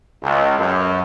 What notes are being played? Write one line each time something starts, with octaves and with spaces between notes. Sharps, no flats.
C#2
F#2